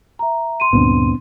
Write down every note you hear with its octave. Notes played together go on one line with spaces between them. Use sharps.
E5 A#5
C6 D#7
D2 G2 A#2 B3 C4 D4